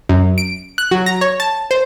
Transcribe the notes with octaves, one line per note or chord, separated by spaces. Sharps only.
F#2
D7
F#6
F#3
A#5
C#5
A5
C5